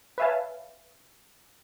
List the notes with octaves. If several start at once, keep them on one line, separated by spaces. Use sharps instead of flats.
B4 C#5 E5 F5 G#5 A5